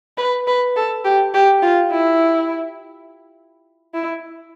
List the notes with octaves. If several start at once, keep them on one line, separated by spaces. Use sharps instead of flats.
B4
B4
A4
G4
G4
F4
E4
E4